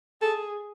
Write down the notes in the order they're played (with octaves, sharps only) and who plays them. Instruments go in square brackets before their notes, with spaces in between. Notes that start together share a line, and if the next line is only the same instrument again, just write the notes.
[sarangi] G#4 [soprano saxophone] A4